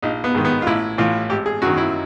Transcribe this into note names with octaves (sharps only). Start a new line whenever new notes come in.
A#1 D#4
B3
G#2 D#3
B3
F4
A1 E4
A2 E3 F4
G#1 G4
G#4
F#2 D#3 F#4
E4